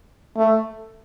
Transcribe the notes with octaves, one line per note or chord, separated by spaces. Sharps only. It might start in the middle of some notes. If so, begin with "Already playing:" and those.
A3